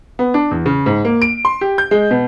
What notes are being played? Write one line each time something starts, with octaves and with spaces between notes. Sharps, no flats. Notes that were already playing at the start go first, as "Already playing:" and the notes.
B3
D4
E2
C#3
G#2
A#3
D7
C6
G4
G6
G#3
B2